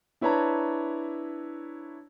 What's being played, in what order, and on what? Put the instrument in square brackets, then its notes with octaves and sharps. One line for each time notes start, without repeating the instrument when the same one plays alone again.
[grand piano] D4 E4 B4 C#5 A5 A#5